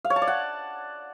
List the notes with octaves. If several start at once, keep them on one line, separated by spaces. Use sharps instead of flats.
F5
C#5
A5
D5
F#5